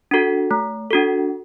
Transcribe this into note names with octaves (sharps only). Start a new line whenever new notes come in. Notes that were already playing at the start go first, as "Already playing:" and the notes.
D4 F#4 A4
A3
D4 F#4 A4